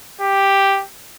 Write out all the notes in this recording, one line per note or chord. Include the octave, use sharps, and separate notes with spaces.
G4